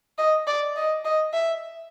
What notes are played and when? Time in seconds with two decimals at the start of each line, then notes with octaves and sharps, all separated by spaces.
0.18 D#5
0.47 D5
0.76 D#5
1.05 D#5
1.33 E5